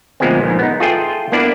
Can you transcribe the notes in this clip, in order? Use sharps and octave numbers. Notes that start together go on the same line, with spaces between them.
D2 A#2 F3 G#3 B3 C4
A#1 G#2
B3 D#4
F4 G#4 A4 E5 G5
A#3 B3 D4 E4 D5